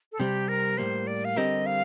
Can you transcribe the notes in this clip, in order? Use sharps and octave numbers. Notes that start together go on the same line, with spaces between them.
A4
C3 G3 C4 G4
A#4
A2 G3 A#3 C5
D5
F5
D3 G3 C4 G4 A#4 D#5
F5